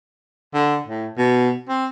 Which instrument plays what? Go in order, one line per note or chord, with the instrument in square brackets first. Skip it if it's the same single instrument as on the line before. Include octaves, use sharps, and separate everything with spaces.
[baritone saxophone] D3
A2
B2
C4